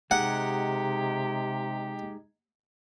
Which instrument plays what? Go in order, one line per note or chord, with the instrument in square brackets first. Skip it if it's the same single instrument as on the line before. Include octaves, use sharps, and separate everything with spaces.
[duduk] C3 [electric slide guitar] G#3 D#4 [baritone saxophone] G4 [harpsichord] F#5